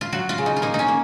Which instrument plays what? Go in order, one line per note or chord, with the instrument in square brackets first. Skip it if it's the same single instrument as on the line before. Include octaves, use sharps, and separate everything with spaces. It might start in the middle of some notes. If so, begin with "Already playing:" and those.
[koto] F4
F#3 F#4
F4
C#3
D#4
F4
A#3 D#4
C#4 D#4
A#3